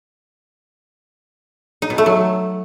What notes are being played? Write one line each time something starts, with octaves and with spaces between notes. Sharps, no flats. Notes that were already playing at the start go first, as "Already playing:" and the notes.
D#4
B2
A3
F#3